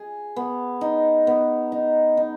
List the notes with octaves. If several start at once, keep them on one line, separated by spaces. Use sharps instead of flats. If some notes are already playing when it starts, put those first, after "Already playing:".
Already playing: G#4
B3
D#4
B3
D#4
D#4